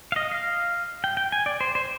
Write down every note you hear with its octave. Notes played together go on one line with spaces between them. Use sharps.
F5
D#5
F5
G5
G5
G#5
D5
C5
C5